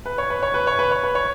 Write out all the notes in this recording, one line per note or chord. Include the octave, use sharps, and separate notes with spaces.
B4
C#5
B4
C#5
B4
C#5
B4
C#5
B4
C#5